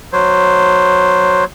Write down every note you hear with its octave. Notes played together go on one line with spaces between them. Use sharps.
F#3 C5